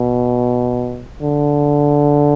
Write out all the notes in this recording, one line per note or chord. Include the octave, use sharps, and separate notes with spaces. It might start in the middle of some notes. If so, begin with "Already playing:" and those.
Already playing: B2
D3